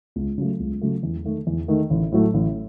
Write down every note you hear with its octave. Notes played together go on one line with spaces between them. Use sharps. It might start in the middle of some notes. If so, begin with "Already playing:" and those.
C#2
C#3 F#3 A3
C#2
C#3 F#3 A3
E2
D#3 A3
E2
D#3 A3
A1
A2 F#3 A3
A1